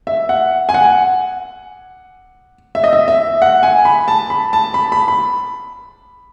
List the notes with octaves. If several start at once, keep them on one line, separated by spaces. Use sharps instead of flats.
E5
F#5
G#5
F#5
E5
D#5
E5
E5
F#5
G#5
B5
A5
B5
A5
B5
B5
B5